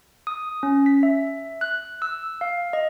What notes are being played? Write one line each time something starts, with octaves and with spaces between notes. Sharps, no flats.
D#6
C#4
B6
E5
F#6
E6
F5
D#5